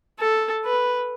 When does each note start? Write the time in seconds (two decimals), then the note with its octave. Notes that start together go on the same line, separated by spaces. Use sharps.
0.19 A4
0.65 B4